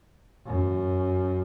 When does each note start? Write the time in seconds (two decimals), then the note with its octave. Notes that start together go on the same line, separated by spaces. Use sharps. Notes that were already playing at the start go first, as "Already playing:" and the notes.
0.46 F#2